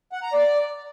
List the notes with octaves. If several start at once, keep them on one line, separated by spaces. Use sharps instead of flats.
F#5
A#5
D5